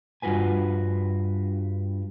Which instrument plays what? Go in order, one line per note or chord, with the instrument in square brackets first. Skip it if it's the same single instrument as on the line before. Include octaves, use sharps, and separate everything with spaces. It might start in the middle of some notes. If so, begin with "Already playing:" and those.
[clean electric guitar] G2 F4 F#4 B4 G#5